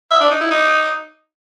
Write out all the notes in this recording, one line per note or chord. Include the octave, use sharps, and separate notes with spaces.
E5
D4
D#4
E4
D#4